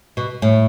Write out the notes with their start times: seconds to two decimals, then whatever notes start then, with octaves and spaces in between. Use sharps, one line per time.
0.17 B2
0.42 A2